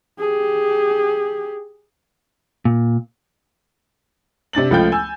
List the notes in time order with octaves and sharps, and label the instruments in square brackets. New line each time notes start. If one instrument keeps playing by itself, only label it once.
[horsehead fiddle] G4 G#4
[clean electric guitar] A#2
[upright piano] C3 D4 A6 F#7
C#2 F3 A3 F4 G5 G6
G#5 E6